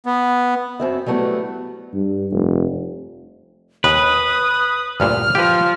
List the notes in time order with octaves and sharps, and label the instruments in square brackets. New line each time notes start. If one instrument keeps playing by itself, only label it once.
[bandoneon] B3
[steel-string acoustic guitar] F#2 C4 E5
F#3 G3 A3 B3 E4
[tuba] G2
F1
[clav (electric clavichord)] D#2 [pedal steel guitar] B4 [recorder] D#6
[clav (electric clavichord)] D2 G2 A#2 [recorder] F6
[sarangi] F3 [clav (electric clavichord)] G4 B4